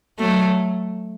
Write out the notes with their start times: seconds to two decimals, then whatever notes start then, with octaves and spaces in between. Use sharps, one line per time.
0.19 F#3 A3